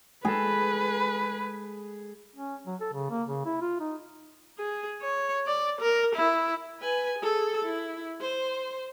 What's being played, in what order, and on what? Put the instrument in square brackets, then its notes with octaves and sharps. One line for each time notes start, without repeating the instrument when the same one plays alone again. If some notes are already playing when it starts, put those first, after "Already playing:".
[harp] G#3 A4 [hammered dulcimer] G#4 [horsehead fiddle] B4
[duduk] C#4
F#3
A4
C#3
A#3
C#3
E4
F4
D#4
[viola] G#4
C#5
D5
A#4
E4
B4 G#5
G#4 A4
E4
C5